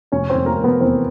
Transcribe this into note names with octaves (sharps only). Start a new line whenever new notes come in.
F1 C#4 C#5
F1 C4 C5
A#3 A#4
F1
B3 B4
E2 C4 C5